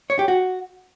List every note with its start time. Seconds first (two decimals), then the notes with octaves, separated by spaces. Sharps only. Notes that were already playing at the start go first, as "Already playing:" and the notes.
0.10 C#5
0.19 G4
0.28 F#4